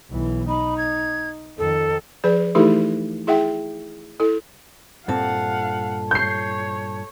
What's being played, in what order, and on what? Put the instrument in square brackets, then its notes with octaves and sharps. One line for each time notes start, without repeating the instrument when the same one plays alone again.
[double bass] B1 E3
[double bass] D#4 [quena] B5
[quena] G#6
[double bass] F2 D#3 [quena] A4
[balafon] F3 G#4 B4 D5
E3 A3 D#4 E4 G4 A4
E4 G#4 E5 F#5 G5
E4 A4
[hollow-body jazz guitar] G2 A#2 C4 [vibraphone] A4 A5 [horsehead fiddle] F5 F#5
[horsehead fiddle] C#5 [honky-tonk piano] G6 C7